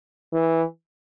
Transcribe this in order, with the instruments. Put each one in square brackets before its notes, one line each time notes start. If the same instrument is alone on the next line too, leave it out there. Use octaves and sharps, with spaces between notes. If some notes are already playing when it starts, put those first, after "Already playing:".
[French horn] E3